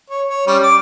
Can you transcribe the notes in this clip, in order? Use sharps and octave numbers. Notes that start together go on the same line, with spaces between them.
C#5
C#5
G3 C#4
D6